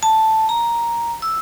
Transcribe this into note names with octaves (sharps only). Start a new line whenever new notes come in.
A5
A#5
E6